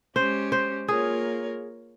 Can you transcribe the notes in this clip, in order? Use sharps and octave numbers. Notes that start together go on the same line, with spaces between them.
G#3 C#4 G4 C5
C5
A#3 F4 G#4 A#4 C#5